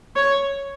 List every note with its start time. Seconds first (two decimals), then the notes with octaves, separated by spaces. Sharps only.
0.16 C#5